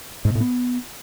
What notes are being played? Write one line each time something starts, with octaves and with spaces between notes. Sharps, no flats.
G#2
B2
A2
B3